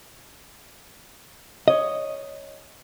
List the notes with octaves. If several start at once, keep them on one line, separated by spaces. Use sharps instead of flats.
C#5 D#5